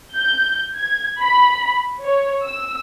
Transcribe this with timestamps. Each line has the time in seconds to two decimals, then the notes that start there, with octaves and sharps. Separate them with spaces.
0.15 G6
0.77 G#6
1.21 B5
2.03 C#5
2.46 E6